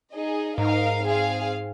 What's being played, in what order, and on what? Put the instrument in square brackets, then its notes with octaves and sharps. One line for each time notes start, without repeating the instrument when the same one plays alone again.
[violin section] D#4 G#4 D#5
[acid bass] G#2 [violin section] D#4 A#4 F5
[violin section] C4 G#4 F5